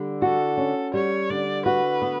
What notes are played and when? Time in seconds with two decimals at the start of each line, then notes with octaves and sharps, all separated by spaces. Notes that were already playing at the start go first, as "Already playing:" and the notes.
Already playing: D3 G3
0.22 F#4 A4
0.57 C#4
0.94 G3 C#5
1.30 D3 D5
1.66 F#4 B4
2.02 B3